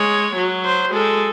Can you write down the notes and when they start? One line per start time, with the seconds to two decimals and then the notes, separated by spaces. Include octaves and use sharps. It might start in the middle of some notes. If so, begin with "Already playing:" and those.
Already playing: G#3 C#5
0.36 F#3
0.65 C5
0.93 G#3 A4